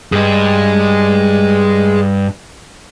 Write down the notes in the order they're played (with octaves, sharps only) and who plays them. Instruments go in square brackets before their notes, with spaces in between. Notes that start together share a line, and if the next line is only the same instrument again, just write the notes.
[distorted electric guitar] G2 [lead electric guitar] G#4 D#5